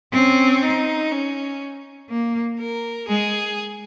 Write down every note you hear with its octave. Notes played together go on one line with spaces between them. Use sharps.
C4 C#4
D#4
C#4
A#3
A#4
G#3 G#4